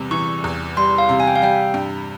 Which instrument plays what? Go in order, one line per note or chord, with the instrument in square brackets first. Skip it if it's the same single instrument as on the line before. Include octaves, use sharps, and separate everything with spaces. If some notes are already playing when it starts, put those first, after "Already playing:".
Already playing: [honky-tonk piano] E2 C3 G3
[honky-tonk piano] E3 [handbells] C#6
[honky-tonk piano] E2
[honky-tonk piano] G3 [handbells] C6
[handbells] F5
[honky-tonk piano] C3
[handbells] G#5
G5
F5
[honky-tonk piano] G3 [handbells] G5
[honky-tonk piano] G2